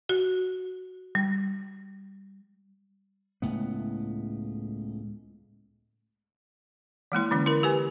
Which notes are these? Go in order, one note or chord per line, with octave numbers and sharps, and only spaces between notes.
F#4
G3
C#2 A2 B3
E3 G#3 A#3 E4
D3 E3 C#4
E4 A#4
G4 B4 G#5